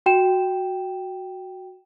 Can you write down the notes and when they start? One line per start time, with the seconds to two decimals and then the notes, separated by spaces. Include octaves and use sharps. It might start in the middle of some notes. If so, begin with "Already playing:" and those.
0.06 F#4 G5 E7